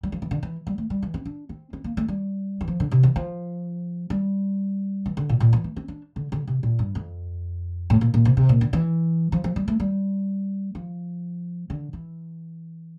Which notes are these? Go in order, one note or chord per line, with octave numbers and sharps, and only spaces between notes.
G3
F3
E3
D3
E3
G3
A3
G3
E3
C4
D4
C4
C4
A#3
A3
G3
E3
F3
D3
C3
E3
F3
G3
E3
D3
A#2
A#2
E3
A3
C4
D4
D3
D3
C3
A#2
G2
F2
A2
A#2
A#2
C3
C3
A#2
D3
E3
F3
F3
G3
A3
G3
F3
D3
E3